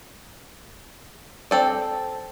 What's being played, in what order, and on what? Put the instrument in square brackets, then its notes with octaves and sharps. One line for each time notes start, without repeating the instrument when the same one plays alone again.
[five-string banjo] C4 A4 D5